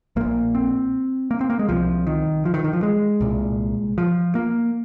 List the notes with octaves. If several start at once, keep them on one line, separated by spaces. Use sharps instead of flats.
A#1 A#2 A#3
C4
A#3
C4
A#3
G#3
C2 C3 F3
D#3
F3
D#3
D#3
F3
G#3
C2 A#2
F3
A#3